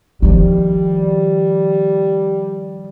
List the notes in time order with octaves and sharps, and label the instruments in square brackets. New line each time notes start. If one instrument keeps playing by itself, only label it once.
[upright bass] D#3 F3 [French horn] G3